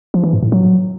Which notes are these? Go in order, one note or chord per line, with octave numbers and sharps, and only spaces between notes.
F3
E3
G#2
A2
F#3